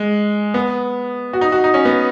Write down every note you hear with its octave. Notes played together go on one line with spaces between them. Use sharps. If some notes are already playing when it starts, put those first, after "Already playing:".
Already playing: G#3
B3
F#4
D#4
F#4
D#4
C#4
B3